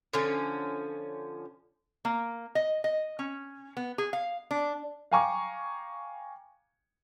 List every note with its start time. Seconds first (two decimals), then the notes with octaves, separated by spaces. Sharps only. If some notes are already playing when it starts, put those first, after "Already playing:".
0.13 D3 F3 C#4
2.05 A#3
2.55 D#5
2.84 D#5
3.19 C#4
3.77 B3
3.98 G#4
4.13 F5
4.51 D4
5.11 F5 G5 G#5 A#5 C#6 D6